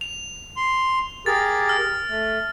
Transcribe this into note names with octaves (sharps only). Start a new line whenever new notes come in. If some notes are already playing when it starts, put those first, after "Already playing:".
F7
C6
G4 G#4 A#4 A6
F6
A3